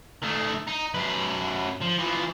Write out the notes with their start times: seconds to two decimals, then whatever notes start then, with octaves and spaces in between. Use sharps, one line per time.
0.22 D#3 A3
0.67 D#4
0.94 F#2 B4
1.82 F3
1.99 E3 F3